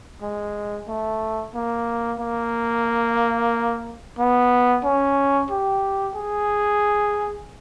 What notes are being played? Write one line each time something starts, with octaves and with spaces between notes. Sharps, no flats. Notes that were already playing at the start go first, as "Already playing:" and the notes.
G#3
A3
A#3
A#3
B3
C#4
G4
G#4